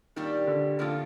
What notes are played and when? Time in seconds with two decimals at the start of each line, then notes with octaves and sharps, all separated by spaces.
0.16 A#2 D#3 G3 D4 G4
0.47 D3
0.79 A2 D3 F3 A#3 F4 A4